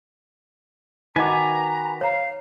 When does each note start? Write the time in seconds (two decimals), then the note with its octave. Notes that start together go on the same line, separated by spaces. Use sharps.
1.16 D#3 D#4 F#4 B4 D#5 G#5 A#5 D6
2.01 C#5 F5 A#5